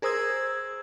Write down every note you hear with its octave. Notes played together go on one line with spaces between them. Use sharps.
G#4 A#4 C5 D#6 E6 G#6